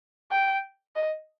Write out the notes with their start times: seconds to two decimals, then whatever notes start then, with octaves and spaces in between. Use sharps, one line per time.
0.31 G5
0.96 D#5